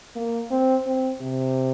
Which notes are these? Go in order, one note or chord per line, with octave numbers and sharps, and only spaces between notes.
A#3
C4
C4
C3